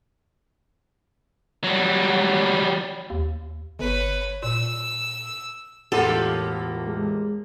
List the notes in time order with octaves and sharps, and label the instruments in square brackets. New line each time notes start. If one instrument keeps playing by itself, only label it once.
[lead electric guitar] F#3 G3
[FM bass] D#2
[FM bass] G1 [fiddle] B4 C#5
[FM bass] A#2 [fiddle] E6
[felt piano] E1 A2 F#5 [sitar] A#3 F4 G4 [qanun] A4
[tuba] G#3